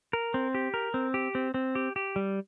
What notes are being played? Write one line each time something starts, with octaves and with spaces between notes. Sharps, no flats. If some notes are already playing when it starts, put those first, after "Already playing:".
A#4
C4
G4
A#4
C4
G4
C4
C4
G4
G4
G3